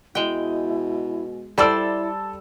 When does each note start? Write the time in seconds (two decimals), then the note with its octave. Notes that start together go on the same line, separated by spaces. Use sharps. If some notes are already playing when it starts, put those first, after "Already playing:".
0.15 B2 G#3 E4 G5
1.58 G3 E4 A4 C5 D5 E6